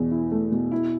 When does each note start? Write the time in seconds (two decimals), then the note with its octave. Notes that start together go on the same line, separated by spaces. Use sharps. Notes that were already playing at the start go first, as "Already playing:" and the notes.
Already playing: E2 B2
0.11 E4
0.31 A3
0.52 B2
0.72 E4